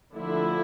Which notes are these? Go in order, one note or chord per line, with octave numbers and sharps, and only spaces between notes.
D3 F3 A3 D4 E4